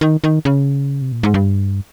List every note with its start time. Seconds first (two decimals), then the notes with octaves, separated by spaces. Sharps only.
0.01 D#3
0.24 D#3
0.45 C#3
1.02 C3
1.12 A#2
1.23 G#2
1.34 G2